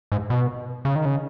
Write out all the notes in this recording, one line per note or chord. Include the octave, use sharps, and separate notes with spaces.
G#2
B2
C#3
D#3
C#3